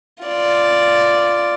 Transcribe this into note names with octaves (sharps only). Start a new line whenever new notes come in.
F4 D5